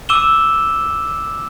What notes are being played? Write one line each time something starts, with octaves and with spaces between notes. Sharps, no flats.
D6 E6 D#7 E7 G7